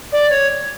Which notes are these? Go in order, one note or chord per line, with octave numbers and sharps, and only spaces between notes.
D5
C#5